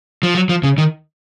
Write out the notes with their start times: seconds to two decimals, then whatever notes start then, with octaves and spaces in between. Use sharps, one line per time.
0.23 F3
0.35 F#3
0.49 F3
0.63 C#3
0.78 D#3